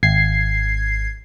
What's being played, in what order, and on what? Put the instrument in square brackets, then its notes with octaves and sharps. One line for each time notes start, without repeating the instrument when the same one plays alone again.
[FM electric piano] G#1 G#6 C7